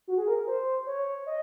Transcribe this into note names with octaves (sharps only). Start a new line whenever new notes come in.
F#4
G#4
A#4
C5
C#5
D#5